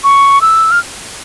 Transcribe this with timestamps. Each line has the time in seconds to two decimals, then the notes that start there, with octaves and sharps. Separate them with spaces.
0.04 C#6
0.42 E6
0.71 F6